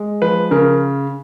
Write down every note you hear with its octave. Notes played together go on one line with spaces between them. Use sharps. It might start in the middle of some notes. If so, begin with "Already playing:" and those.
Already playing: G#3
F3 B4
C#3 A#4